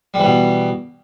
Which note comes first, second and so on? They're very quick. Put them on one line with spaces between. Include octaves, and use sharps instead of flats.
G3 E3 B2